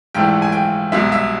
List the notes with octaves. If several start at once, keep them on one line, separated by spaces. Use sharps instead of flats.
A#1 G#2 E3 A3 G5
G#5
G5
C2 B2 G#3 E5
E5